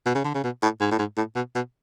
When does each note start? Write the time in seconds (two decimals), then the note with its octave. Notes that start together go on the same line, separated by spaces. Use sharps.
0.06 B2
0.15 C#3
0.24 D3
0.34 C#3
0.44 B2
0.62 A2
0.80 G#2
0.91 A2
0.99 G#2
1.17 A2
1.35 B2
1.55 B2